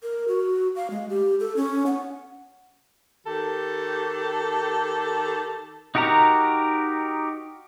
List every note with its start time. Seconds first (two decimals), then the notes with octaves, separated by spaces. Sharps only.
0.03 A#4
0.28 F#4
0.76 F5
0.91 G#3
1.09 G4
1.40 A4
1.57 C#4
1.86 F#5
3.27 D#3 G4 A4
5.95 D#4 F#4 G4 A#4 A#5